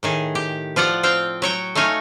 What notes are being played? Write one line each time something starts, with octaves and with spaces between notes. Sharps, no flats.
A2 D#3 G#4
G4
F3 F4 D5 F#5
C4 F5 G5
F#3 C#5 G5
A3 D#4 C#5 F5 G#5